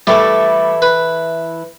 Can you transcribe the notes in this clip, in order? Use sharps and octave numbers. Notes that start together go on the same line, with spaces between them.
E3 G3 A3 E4 A4
B4